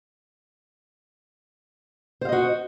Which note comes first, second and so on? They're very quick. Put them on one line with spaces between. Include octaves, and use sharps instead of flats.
C5 F5 D#5 F#4